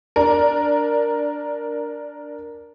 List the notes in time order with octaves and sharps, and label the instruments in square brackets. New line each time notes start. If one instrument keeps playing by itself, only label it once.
[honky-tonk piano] D4 A#4